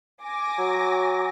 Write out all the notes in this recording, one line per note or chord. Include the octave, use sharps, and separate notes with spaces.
G#5 D6 A#6
F#3